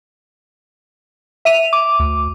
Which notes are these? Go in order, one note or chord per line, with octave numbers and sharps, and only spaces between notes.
E5 D#7 F7
D6
D2